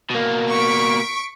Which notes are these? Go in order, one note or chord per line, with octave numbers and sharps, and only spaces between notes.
B2 A#3
C#6 B6 D7